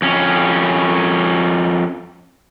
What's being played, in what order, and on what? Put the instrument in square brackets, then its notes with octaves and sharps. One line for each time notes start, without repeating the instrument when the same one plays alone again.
[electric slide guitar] F2 C#4